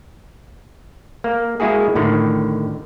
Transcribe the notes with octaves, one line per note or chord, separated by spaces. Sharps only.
A#3
G#3 A#3 E4 F#4 G#4
A2 D3 D#3